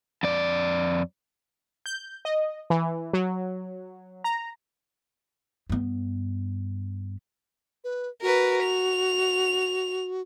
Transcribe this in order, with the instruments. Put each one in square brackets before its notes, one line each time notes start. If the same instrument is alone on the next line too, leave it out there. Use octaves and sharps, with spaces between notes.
[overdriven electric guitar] F2 D5
[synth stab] G6
D#5
E3
F#3
A#5
[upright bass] G2 B3
[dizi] B4
[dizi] F#4 [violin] A#4 B4
[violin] F7